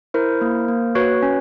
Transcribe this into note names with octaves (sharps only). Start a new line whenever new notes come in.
E4 A#4 C5
A#3
A#3
F#4 B4 C#5
C#4